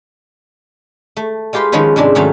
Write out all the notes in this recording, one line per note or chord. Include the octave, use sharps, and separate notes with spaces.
A3
G#3 F4 G4 B4 C6
D#3 F3 G#3 C#4 B4
G#2 C3 G#3 D4
G#2 D#3 F#3 A3 C#4